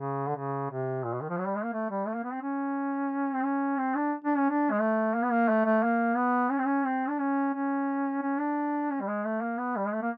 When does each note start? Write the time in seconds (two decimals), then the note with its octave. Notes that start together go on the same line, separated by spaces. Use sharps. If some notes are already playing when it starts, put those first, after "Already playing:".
Already playing: C#3
0.27 D3
0.36 C#3
0.71 C3
1.05 A#2
1.14 B2
1.22 D#3
1.29 F3
1.38 F#3
1.47 G3
1.56 G#3
1.64 A#3
1.73 A3
1.90 G3
2.07 A3
2.15 A#3
2.24 B3
2.33 C4
2.41 C#4
3.34 C4
3.44 C#4
3.78 C4
3.95 D4
4.24 D4
4.37 C#4
4.50 D4
4.71 G#3
4.80 A3
5.14 A#3
5.23 B3
5.32 A#3
5.49 A3
5.65 A3
5.83 A#3
6.16 B3
6.51 C#4
6.58 C4
6.66 C#4
6.85 C4
7.09 D4
7.19 C#4
7.54 C#4
8.22 C#4
8.39 D4
8.90 C#4
9.01 G3
9.08 G#3
9.25 A3
9.41 A#3
9.58 B3
9.76 G3
9.85 G#3
9.93 A3
10.02 A#3